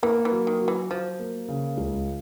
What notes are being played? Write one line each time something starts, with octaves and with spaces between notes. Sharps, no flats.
E3 A#3
E3
F#3
D#3
F#3
E3
F3 F#3
A#3
C#3
C#2